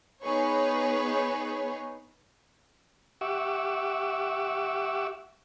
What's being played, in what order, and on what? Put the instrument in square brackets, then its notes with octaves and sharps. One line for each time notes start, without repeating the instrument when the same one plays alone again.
[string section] B3 D#4 G#4 B4 C#5
[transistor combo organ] G4 E5 F#5 C#6 D6 E6